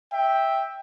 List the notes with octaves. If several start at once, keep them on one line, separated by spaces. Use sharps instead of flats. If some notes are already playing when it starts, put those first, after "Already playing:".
E5 G5